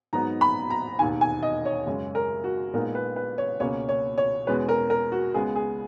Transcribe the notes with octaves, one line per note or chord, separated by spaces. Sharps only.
G#2 F#3 B3 D#4 A#5
B5
A#5
E1 D#2 D#3 G#5
G#5
D#5
C#5
F#2 C#3 G#3 C#4
A#4
F#4
A#1 A#2 G#3 B3 D#4 A#4
B4
B4
C#5
C#2 B2 A#3 C#4 C#5
C#5
C#5
E2 B2 G#3 C#4 B4
A#4
A#4
F#4
C#2 C#3 G#3 B3 G#4
G#4